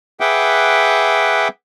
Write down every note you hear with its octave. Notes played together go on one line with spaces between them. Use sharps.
G#4 B4 E5 F#5 G5 D6